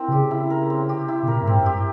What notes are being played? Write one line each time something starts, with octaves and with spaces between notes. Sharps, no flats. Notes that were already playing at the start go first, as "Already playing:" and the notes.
Already playing: C4 E4 A#4
C3
C#3 G4
E4
A#4
C4
G4
E4
C3
A#2 A#4
G#2 C4
G2
G4